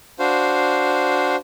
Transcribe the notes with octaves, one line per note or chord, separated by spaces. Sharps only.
D4 F#4 C5 F5